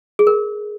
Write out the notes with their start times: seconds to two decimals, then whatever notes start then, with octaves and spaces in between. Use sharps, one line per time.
0.19 G#4
0.27 A#4